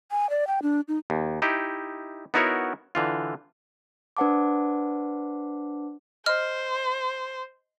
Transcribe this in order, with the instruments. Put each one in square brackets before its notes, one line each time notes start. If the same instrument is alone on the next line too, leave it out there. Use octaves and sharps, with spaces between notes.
[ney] G#5
D5
G5
D4
D#4
[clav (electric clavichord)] D#2
D#4 E4 G4
B3 D#4 E4 F#4 A#4 C#5
D3 E3 F4
[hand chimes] D4 B4 C5 F#5 A5 D6
[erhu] C5 [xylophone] D#5 F6